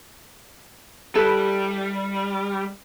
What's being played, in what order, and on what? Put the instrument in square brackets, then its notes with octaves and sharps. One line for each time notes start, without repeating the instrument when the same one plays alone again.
[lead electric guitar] G3 [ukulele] E4 A4 B4